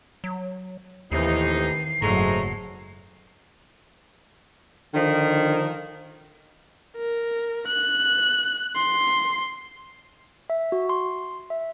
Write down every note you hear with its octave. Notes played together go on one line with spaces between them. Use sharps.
F#3
D#2 A2 C3 D#3 E3 D#4 C7
F#1 G#2 F#3 G#3 A3 A#5
D3 D#3 F3
A#4
F#6
C6
E5
F#4
C6
E5